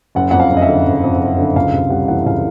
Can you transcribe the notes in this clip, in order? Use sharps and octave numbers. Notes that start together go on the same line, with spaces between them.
F#1 F#5
F2 F#5
F5
F#1
D#5
E5
D3
F#1
F2
F#1
D3
C#2 F5
C3
G3 F#5
E3 F#5
C#2 F5